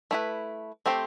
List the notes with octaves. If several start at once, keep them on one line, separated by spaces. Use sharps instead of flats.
A3 E4 B4
A3 C4 G4 C5